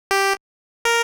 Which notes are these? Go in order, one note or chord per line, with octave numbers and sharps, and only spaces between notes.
G4
A#4